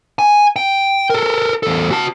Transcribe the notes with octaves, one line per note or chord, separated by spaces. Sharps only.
G#5
G5
A4 A#4
E2 A4
F#4 A5